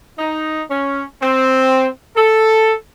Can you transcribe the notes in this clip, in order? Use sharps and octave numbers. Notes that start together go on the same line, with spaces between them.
D#4
C#4
C4
A4